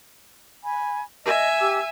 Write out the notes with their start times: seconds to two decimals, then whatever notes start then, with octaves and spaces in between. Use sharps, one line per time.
0.64 G#5 B5
1.25 D#5 E5 G#5
1.59 G4 D6 E6